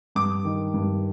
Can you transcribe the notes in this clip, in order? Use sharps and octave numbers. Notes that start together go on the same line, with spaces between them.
G2 D6
D#3
G2